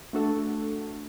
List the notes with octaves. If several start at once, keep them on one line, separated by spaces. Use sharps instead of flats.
A3 D4 F#4 A4